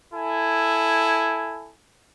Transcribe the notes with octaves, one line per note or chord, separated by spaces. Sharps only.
E4 A4 G#5